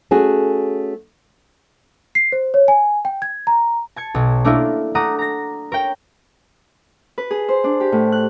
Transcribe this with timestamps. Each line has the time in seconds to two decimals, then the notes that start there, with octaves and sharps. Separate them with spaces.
0.11 A3 C#4 F#4 G#4
2.15 C7
2.32 C5
2.54 C#5
2.68 G#5
3.05 G5
3.22 G#6
3.47 A#5
3.96 A5 G#6 C#7
4.15 B1
4.45 A3 A#3 D4 E4 F4 A#4
4.95 A3 F#5 A#5 D6 D#6 D#7
5.19 A#5 A#6
5.72 A#4 C#5 G5
7.18 B4
7.31 G#4
7.49 C5
7.64 D4
7.80 G4
7.92 A2
8.12 F#6